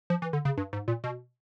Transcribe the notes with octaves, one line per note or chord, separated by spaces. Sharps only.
F3
E3
D3
C#3
G2
G#2
A#2
B2